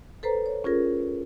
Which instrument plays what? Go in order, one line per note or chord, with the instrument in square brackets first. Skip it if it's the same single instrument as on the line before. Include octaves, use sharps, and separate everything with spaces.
[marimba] A4 B4 C5 A#5
C#5
C#4 F4 G#4 A#4